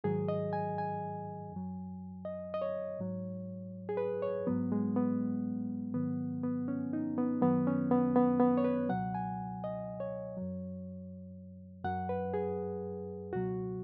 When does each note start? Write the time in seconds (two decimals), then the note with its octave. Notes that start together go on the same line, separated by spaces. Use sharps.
0.04 G#2 D#3 F#3 G#4
0.28 D#5
0.53 G#5
0.78 G#5
1.52 F#2 F#3
2.25 D#5
2.54 D#5
2.62 C#5
2.99 G#2 F#3
3.89 G#4
3.97 B4
4.22 C#5
4.47 G#2 F#3 B3
4.72 G#3
4.96 B3
5.94 G#2 D#3 F#3 B3
6.44 B3
6.68 C#4
6.93 D#4
7.18 B3
7.41 F#2 D#3 F#3 B3
7.67 C#4
7.91 B3
8.16 B3
8.40 B3
8.57 C#5
8.64 B4
8.89 C#2 B2 F#3 F#5
9.14 G#5
9.64 D#5
10.00 C#5
10.37 F#2 F#3
11.84 F#2 F#3 F#5
12.09 B4
12.34 G#4
13.32 C#2 B2 F#3 F#4